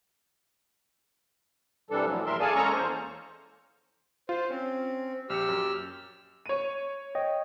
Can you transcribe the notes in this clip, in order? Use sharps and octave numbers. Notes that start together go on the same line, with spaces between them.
C3 E3 G3 D4 A4
A2 F3 F#3
D#2 A2 E3 A#4 E5 C6
G#4 A4 D5 F5 G#5 A5
G#3 A#3 C#4 A4 A#5 C#6
E2 C5
F4 C5
C4 C#4
A#1 G4 E6 F6 C#7
F#2
C#5 D#7
C#5 D#5 G5